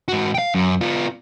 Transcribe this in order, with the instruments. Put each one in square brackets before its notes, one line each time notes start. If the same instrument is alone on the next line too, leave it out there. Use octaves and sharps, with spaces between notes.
[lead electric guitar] G#2 F#4
F5 G5
F#2
B3 F4